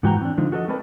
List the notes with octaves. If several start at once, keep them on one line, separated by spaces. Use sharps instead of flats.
G#2 E3 F#4 G5 G#5 A#5
C4 D4
D3 F3 D#4
F#4 A4 B4 D#5
A3 C4 A#4 B4 D5 A5